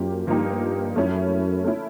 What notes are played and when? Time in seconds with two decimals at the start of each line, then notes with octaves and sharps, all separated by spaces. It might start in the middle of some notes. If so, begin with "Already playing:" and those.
Already playing: F#2 F3 A#3 G4
0.27 G2 F3 A#3 D#4 G4
0.96 F#2 A3 C#4 E4
1.64 A3 C#4 E4